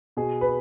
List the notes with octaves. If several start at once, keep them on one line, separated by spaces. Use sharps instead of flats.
B2 G#4
B4